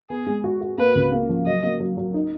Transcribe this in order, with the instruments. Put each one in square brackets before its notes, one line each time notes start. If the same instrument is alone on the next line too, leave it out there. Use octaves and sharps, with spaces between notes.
[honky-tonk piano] B3 [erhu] G#4
[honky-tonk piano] G#3
F#4
F#4
[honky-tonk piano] A#3 [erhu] B4
[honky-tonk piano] C#2
A#3
F3
[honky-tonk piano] F#3 [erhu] D#5
[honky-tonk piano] A#3
F#3
F#3
D#4